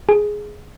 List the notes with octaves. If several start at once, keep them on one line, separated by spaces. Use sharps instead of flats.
G#4